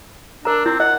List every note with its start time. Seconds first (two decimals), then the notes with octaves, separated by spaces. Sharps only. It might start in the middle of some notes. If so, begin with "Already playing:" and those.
0.45 D4 A#4 A#5
0.66 C4 E4
0.80 D#5 F#5